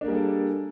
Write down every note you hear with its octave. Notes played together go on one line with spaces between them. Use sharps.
G3 A#3 D4 G#4 A4